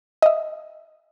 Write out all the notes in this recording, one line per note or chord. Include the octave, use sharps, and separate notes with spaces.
D#5 E5